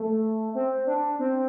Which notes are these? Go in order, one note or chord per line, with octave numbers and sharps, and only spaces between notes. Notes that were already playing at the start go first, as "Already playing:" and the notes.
Already playing: A3
C4
D4
C4